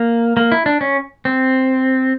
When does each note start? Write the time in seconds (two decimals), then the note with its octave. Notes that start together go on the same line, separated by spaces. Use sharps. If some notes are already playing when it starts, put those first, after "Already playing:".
Already playing: A#3
0.37 A#3
0.52 E4
0.66 D4
0.81 C#4
1.25 C4